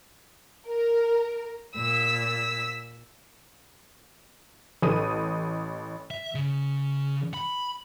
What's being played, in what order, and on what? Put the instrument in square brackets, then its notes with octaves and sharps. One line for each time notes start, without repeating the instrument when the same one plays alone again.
[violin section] A#4
[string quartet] A#2 [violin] E6 B6
[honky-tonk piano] A1 A4 D#6 D#7
[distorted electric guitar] E5
C#3
B5